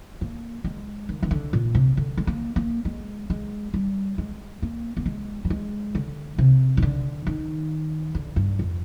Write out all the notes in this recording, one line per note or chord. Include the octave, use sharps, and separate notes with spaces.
A#3
G#3
D#3
D#3
D3
A#2
C3
D3
G#3
A#3
A#3
G#3
G#3
G3
G#3
A#3
A#3
G#3
G3
G#3
D3
C3
D#3
D3
D#3
D3
G2
F2